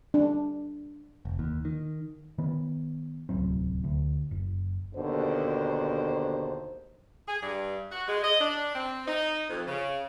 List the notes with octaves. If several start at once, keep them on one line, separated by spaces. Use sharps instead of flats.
D4
F1
D#2
D#3
D#3 B3
D1 C2 F#3 C4
D2
F#1
D#2 B2 D3 C5
G#4
G2
F#4
G#3
D#5
D4
C4
D#4
F2
C#3